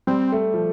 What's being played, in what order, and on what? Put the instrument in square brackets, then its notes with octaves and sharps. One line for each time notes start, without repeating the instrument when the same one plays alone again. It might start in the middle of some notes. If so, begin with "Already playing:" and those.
[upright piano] G3 [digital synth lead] C4
[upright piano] A3
F3